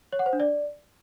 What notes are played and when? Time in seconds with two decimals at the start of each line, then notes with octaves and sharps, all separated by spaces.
0.13 C#5
0.19 F#5
0.26 C5
0.33 D4
0.40 D5